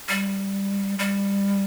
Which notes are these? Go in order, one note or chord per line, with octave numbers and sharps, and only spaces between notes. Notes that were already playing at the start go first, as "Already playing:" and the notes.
G3
G3